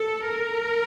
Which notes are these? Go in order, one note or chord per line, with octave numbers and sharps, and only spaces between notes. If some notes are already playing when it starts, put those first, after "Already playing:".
Already playing: A4
A#4